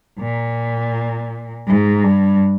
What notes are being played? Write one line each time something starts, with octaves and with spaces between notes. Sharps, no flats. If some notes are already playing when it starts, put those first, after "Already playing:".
A#2
G#2
G2